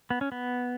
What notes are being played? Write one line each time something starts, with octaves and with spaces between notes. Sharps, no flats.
B3
C#4
B3